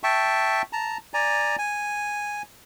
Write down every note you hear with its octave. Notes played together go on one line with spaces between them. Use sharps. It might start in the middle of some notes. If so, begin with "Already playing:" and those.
E5 G5 A5 C#6
A5 A#5
D5 G#5 A#5
G#5